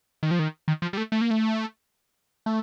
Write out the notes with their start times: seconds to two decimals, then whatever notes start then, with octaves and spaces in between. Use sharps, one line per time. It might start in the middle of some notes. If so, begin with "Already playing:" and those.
0.23 D#3
0.31 F3
0.39 D#3
0.68 D#3
0.82 F3
0.93 G3
0.97 A3
1.12 A3
1.21 A#3
1.31 A3
2.46 A3